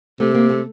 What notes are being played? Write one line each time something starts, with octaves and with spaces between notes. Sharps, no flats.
C3 A3
A#3
A3